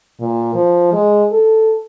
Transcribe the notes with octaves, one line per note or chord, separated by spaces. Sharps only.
A#2
F3
G#3
A4